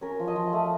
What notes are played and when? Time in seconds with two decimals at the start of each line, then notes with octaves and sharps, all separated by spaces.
0.01 C#4 A#4
0.19 F3
0.28 D#5
0.36 F3
0.53 A3